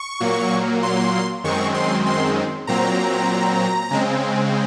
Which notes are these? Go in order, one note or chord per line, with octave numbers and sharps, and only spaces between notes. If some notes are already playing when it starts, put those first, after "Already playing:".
Already playing: C#6
A#2 F#3 A#3
C6
F#2 D#3 G#3 C4 C#6
C6
C6
A#2 F#3 C4 A#5
C#3 G#3 C4